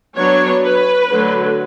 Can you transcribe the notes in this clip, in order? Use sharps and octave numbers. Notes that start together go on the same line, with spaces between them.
F#3 B3 D4 C#5
B4
D3 F#3 A3